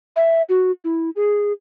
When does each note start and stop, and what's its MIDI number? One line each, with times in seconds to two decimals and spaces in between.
0.16 0.42 76
0.49 0.71 66
0.84 1.10 64
1.16 1.52 68